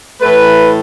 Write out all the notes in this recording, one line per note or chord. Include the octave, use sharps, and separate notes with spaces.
A2 E3 A3 B4